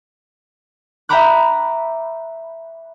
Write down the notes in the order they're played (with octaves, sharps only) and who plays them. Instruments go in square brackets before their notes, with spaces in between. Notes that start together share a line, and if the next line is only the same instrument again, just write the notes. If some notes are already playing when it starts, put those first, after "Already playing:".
[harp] E5 G5 A#5 B5 D6 F#6